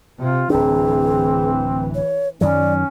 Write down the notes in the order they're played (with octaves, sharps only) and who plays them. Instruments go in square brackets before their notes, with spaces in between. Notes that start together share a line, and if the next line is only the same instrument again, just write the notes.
[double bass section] C3 [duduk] F4
[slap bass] D1 D4 [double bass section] E3 [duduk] C4 [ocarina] G#4
[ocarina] C#5
[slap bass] F#2 D#3 F#3 [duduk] C#4 [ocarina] D5